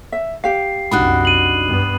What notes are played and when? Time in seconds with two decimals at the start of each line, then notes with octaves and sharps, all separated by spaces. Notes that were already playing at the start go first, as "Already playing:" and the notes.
0.12 E5
0.44 G4 F5 C7
0.91 C2 F#2 D4 D#4 F#4 B5 D#6 F#6
1.25 D#7 F#7
1.67 G2 B3